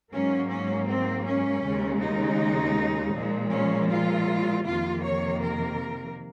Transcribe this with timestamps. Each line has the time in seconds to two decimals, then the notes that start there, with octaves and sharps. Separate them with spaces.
0.12 G#2 F#3 A#3 C#4
0.50 C#4
0.88 C4
1.26 C#4
1.63 D#2 C#3 G#3
2.01 D#4
3.14 A#2 F3 G#3
3.52 C#4
3.90 F4
4.65 F2 C3 D#3 A#3 F4
5.03 C#5
5.40 A#4